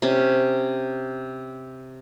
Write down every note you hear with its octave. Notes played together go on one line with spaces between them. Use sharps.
C3 C#4